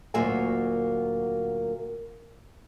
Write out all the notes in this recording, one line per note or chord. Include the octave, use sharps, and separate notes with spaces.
D2 A#2 F#3 A#3 E5 G#5